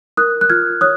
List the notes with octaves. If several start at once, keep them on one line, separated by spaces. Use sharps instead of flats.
A#4 D#6 F#6
F#6
F4 F6 G#6
C#5 D#6 F#6